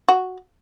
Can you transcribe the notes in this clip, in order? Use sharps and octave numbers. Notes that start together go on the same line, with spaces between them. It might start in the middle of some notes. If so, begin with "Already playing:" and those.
F#4